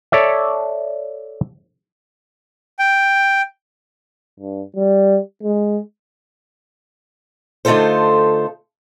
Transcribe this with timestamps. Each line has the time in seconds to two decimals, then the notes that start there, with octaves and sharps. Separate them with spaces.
0.12 A4 C#5 D5 E5
2.79 G5
4.40 G2
4.76 G3
5.43 G#3
7.65 D3 A3 D#4 F4 A4 C5